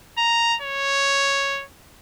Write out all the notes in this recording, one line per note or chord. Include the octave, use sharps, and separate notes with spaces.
A#5
C#5